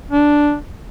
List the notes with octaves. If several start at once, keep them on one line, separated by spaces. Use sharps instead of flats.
D4